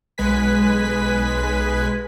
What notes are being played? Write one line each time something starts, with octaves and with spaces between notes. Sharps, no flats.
B1 G#3 B4 G#5 B6